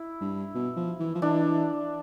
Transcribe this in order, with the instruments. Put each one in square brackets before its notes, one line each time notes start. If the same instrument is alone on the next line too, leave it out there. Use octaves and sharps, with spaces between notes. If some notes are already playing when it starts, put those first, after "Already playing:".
Already playing: [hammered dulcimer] E4
[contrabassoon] G2
B2
F3
E3
F3
[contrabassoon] E3 [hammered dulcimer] D4